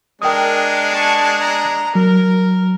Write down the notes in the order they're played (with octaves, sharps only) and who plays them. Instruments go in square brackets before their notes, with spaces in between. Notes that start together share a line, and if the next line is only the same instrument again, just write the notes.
[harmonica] G#3 D4 [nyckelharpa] A#4 [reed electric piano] G5 D#6
[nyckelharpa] A5 C#6
A#5
[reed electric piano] F#3 [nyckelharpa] A#4